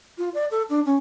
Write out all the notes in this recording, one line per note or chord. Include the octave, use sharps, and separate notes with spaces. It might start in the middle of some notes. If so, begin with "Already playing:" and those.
F4
D5
A4
D4
C#4